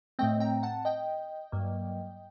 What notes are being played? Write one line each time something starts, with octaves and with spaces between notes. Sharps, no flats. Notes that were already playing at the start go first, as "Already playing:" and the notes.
A2 A3 C4 D#5 G5
G5 A#5
F#5 A5
D#5 G5
G2 F#3 A#3